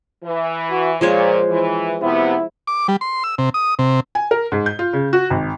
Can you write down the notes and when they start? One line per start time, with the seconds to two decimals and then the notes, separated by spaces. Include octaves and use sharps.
0.24 E3
0.71 F#4
1.01 A#2 F3 G#3 C5 C#5
1.49 E3
2.03 C3 B3 E4
2.67 D6
2.88 G3
3.01 C6
3.24 E6
3.38 C3
3.54 D#6
3.79 C3
4.15 G#5
4.31 A#4
4.52 G#2
4.66 G6
4.79 F4
4.93 C#3
5.13 F#4
5.30 G#1